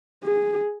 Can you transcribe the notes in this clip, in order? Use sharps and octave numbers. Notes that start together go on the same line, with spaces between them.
G#4